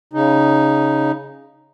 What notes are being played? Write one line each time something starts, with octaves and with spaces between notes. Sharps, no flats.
C#3 D#4